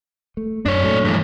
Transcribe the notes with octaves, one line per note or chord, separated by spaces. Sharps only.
A3
F#2 D4 C#5
A#2 F#3 A3
G2 E3